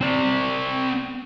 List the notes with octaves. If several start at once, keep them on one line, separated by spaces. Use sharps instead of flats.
C4 D5